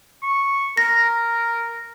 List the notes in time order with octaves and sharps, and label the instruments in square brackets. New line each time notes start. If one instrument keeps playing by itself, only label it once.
[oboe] C#6
[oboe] A#4 [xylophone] A#6